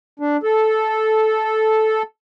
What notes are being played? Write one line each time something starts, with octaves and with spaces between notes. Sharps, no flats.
D4
A4